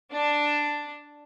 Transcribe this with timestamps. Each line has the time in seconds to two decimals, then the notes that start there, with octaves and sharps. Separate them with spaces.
0.12 D4